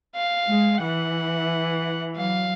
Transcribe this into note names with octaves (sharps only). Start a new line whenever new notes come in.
F5
G#3
E3 F#5
F#3 F5